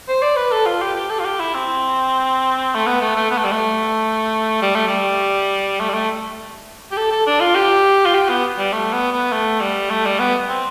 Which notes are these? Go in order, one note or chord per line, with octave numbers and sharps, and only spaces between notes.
C5
D5
B4
A4
F4
G4
G4
A4
F4
G4
E4
C4
A3
B3
A3
A3
B3
A3
G3
A3
G3
A3
G3
A3
G3
A3
G4
A4
A4
D4
F4
G4
F4
G4
B3
G3
A3
B3
B3
A3
G3
A3
G3
B3
C4